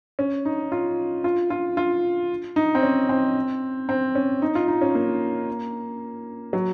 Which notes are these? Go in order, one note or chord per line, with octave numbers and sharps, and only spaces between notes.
C#4
D#4
F4
F4
F4
F4
D#4
C4
C#4
C4
C4
C#4
D#4
F4
D#4
C#4
A#3
F#3